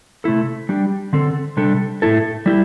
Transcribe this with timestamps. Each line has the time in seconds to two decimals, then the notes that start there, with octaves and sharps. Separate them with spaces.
0.24 C3 A3 E4 A4
0.69 G3 D4 G4
1.13 D3 C4 A4
1.57 C3 G3 D4 A4
2.02 A2 A3 E4 A4
2.46 G3 E4 G4